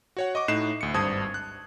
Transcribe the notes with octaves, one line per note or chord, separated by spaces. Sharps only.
F#4 C#5 F#5
D#5 C#6 D6
A2 D#4 F#6 C7 E7
D2 C#7
G#1 G2 C5 A5 D#6 G#6
F#6